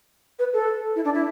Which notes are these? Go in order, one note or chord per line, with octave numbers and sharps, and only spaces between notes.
B4
A4
E4
D4
E4